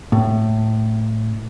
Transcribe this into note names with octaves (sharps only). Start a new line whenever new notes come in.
A2